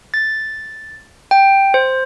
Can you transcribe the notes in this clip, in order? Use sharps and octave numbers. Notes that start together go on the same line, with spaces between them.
A6
G5
C5